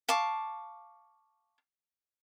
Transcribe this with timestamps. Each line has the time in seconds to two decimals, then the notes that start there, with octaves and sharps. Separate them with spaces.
0.09 F5 A5 C#6 D6